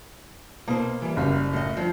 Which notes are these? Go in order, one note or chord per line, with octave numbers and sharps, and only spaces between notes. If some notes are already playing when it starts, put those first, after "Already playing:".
B2 A#3 C5
E3 G3
F#1 G3 F5
A2 D#5
G2 F3